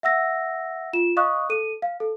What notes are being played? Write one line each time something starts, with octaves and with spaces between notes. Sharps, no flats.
E5 F#5 E6 A#6
F4 E7
D#5 F5 C#6 D#6 F#6
A4 D#7
F5
A4